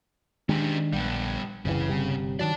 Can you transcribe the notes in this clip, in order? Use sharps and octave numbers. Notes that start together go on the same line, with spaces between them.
D#3 G#3 C#4 D4 G4
A#1 G3 B3
F#1 C2 C#3 E3
G1 C3 G3
D#3 F#3 D5 A5